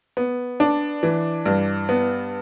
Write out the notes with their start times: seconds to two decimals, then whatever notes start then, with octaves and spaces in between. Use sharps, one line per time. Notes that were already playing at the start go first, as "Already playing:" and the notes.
0.17 B3
0.60 D4
1.03 E3
1.46 G2
1.89 B3